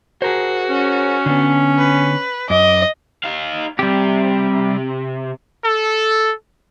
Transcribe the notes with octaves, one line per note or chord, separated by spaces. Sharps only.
F#4 G#4 A#4 C5
C#4
D3 B3
B4
F#2 D#5 D6
D#4 F5
C3 G3 G4
A4